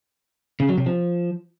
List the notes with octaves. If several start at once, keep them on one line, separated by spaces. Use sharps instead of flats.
C#3
F#3
C3
F3